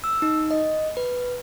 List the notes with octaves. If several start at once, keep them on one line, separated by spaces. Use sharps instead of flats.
E6
D#4
D#5
B4